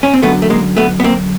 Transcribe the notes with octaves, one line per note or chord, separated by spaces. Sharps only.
C#4
C4
F#2 D3 A3 B3
A3
G#3 A#3
A3 B3
B3
A#3 C4